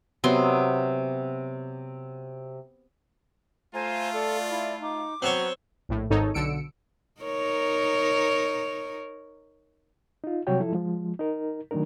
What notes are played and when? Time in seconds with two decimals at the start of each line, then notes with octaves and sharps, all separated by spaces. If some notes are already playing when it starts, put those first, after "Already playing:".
0.24 C3 F#3 B3 C6
3.74 A3 F4 C5 G#5 A#5
4.14 A4 D5
4.51 E4
4.81 D#4 D6
5.22 F#3 B3 C4 F#4 C#5
5.89 A#1 A2
6.10 G#1 G#2 D#4 A4 C#5
6.34 B1 D3 E6 C#7 D7
7.21 D#4 A#4 C#5
10.24 D#4 F4
10.47 C3 F#3 G3 F#4 C#5 G5
10.60 F3 E4 A4
10.72 F3 G#3
11.19 D#4 A#4
11.71 D#3 F#3 A3 D4 D#4 A#4